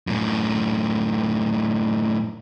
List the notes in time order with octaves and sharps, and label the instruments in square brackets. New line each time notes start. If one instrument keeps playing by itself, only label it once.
[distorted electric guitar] F#2 A2